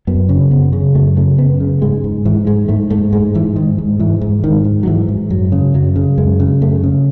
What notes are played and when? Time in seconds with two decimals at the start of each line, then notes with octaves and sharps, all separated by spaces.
0.07 F#2 B3
0.29 C#3
0.51 F#2 B3
0.72 C#3
0.95 F#2 A3
1.16 C#3 A3
1.38 F#2 B3
1.60 C#3
1.82 G#2 G#3
2.04 G#2
2.25 G#2 E3
2.47 G#2 G#3
2.69 G#2 A3
2.90 G#2 A3
3.13 G#2 G#3
3.34 G#2 E3
3.56 G#2 D#3
3.78 G#2
3.99 G#2 E3
4.21 G#2
4.43 G#2 D#3
4.65 G#2
4.83 F#3
4.87 G#2 E3
5.08 G#2
5.30 F#2 F#3
5.52 C#3
5.74 F#2 F#3
5.96 C#3
6.18 F#2 G#3
6.40 C#3
6.61 F#2 A3
6.83 C#3